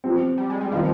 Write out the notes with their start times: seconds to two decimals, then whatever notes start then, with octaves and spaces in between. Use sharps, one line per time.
0.04 F3 C4 G4
0.38 G3
0.50 G#3
0.61 G3
0.72 D#3 F3 G3 C4 D#4